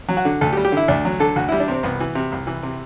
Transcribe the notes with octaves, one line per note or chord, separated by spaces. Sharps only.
F#3
F#4
D3
D2 A4
G4
G3
G4
D3 E4
D2 D4
F#3
D3 A4
D2 F#4
G3 E4
D4
C3 C4
C2 B3
E3
C3
C2
E3
C3